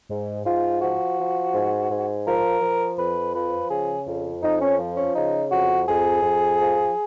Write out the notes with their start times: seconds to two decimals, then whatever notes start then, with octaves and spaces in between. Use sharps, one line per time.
0.09 G#2
0.44 G#2 F4
0.81 F3 F#4
1.18 F3
1.53 G#2
1.90 G#2
2.25 F3 A#4
2.61 F3
2.98 F2 B4
3.33 F3 B4
3.70 C#3 G#4
4.06 F2
4.42 F2 D#4
4.61 C#4
4.78 F3
4.96 C#4
5.15 C#3 D#4
5.50 F2 F#4
5.87 F2 G#4
6.23 F2
6.60 F3